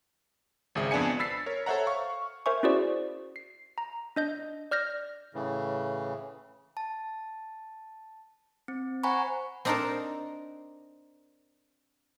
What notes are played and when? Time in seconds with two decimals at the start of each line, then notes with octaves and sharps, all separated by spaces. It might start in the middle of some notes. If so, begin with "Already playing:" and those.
0.75 G#1 C#2 G#4 E5
0.91 F2 B3 D4 D5 G#5 C#7
1.19 B5 E6 A6 B6 C7
1.46 A#4 C#5
1.66 A4 C5 C#5 E5 F#5 A#5
1.87 F5 C#6
2.46 A#4 C5 E5 G#5 C#6
2.63 C#4 E4 F#4 G#4 C5 D5
3.36 C7
3.78 A#5
4.16 D4 D#5 G6
4.71 D5 F6 G6 A#6
5.34 A2 C#3 E3
6.77 A5
8.68 C4
9.03 C5 F#5 G#5 A#5 B5 C#6
9.65 C4 D4 D#4 A4 A#4 C5